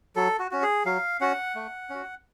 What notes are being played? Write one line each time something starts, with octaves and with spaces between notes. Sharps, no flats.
F#3 A4
F#4
C#4 F#4
G#4
F#3 F5
C#4 F#4 F#5
A3
C#4 F#4